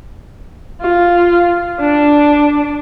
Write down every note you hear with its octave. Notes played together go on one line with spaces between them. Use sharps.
F4
D4